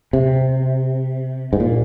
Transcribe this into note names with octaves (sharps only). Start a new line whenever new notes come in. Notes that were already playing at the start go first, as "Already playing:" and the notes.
C3
G#2
A#2